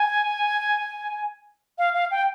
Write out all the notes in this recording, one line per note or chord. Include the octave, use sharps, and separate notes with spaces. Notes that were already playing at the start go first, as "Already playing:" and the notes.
Already playing: G#5
F5
F5
G5